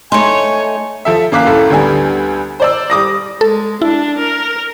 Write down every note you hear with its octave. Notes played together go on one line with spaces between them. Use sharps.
A3 D#4 C#5 G#5 C6
F3 A4 E5
F#2 A#3 F5 D6 F#6 B6
F#2 A2 A3 A4
D2 D3 G3 B3 G#5
C5 D5 E6
G3 D6 D#6 A#6
G#3 A4
D4 E4
A#4